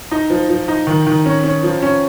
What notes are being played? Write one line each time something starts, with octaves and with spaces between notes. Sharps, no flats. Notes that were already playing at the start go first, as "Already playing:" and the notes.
D#4
F3
F3
D#4
D#3
D#3
C#4
C#4
F3
C#4